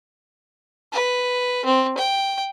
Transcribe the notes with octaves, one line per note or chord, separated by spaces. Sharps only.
B4
C4
G5